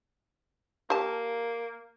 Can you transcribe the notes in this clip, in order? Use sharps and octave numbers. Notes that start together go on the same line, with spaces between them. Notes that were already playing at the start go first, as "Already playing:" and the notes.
A#3 G4 A5